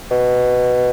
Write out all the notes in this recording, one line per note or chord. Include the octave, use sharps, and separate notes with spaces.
B2